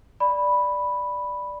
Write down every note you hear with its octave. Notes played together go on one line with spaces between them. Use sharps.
D5 B5